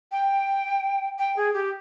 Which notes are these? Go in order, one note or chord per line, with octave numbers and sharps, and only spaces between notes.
G5
G5
G#4
G4